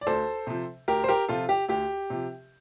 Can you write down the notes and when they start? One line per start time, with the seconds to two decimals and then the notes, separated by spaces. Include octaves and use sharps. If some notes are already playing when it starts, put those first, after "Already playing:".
0.01 D5
0.07 D2 A4 C5
0.47 C3 F3
0.88 D2 G4 A#4
1.04 C5
1.08 G4 A#4
1.29 C3 F3 F4 A4
1.49 G4
1.68 D2 G4
2.10 C3 F3